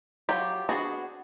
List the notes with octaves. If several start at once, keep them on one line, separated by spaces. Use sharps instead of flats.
F#3 F4 G4
B3 D4 F#4 G#4